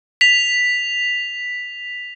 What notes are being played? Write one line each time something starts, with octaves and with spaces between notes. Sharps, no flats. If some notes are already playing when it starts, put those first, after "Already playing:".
B6 F7